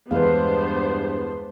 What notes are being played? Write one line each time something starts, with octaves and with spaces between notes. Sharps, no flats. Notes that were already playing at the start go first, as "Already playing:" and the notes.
E2 G2 G#3 B3 D4 B4 C5 F5